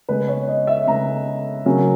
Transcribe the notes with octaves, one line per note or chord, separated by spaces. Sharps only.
C#3 G#3 B3 B4
C#5
D#5
E5
C#3 G#3 B3 A#5
C#3 F#3 A#3 C#4